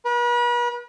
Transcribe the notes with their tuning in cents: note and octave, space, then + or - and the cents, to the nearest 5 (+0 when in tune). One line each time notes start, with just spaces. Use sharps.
B4 -40